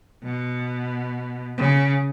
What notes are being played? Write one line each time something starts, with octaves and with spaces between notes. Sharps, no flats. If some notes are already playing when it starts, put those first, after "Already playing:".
B2
C#3